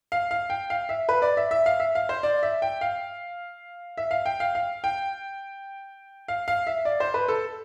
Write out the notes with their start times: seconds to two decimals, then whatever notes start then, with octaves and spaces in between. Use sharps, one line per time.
0.12 F5
0.31 F5
0.50 G5
0.70 F5
0.89 E5
1.09 B4
1.22 D5
1.37 E5
1.51 E5
1.66 F5
1.80 E5
1.95 F5
2.09 C5
2.23 D5
2.43 E5
2.62 G5
2.81 F5
3.98 E5
4.11 F5
4.26 G5
4.40 F5
4.55 F5
4.84 G5
6.28 F5
6.48 F5
6.67 E5
6.85 D5
7.00 C5
7.14 B4
7.28 A4